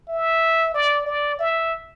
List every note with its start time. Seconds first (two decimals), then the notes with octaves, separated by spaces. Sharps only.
0.09 E5
0.74 D5
1.06 D5
1.39 E5